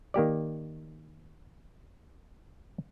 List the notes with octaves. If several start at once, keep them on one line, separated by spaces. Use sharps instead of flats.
D#3 A#3 G4 D5